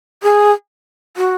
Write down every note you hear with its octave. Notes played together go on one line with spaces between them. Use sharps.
G#4
F#4